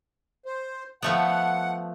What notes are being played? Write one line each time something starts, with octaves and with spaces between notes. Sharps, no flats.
C5
F3 A3 B3 F#5